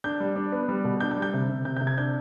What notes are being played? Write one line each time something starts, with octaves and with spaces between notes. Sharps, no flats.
D4 G6
G3
D4
B3
G3
B2
D4 G6
G6
G3
G6
C3
C3
C3 G6
C3 G6
G#6
D4 G6